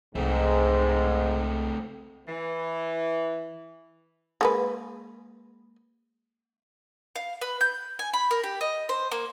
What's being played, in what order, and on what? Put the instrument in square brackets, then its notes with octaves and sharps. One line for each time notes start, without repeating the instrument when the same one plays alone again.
[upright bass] C2 [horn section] G#2 [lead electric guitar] A3 C4
[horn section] E3
[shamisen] G#3 A#3 B4
[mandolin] F5
B4
G6
G#5
B5
A#4
G4
D#5
C5
A#3